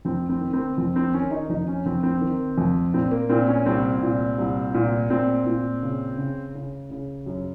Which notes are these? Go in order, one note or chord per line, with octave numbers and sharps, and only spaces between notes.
F2 C4
C4
D#3
C4
F2 C4
C4
D#3 C#4
D#4
F2 D#4
C#4
F2 C4
C4
D#3
F2
A#2 C4
A#3
A#2 C4
C#4
C2 C4
A#2
C2
A#2
A#2 C4
A#2
C#3
C#3
C#3
C#3
F#2